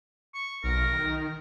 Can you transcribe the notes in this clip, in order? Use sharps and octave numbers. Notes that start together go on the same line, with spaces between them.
C#6
B1 A#4
D#3